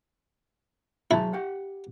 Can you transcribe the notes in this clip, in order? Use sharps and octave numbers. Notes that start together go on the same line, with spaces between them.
F#3 E4 G#4 A5
G4 F#5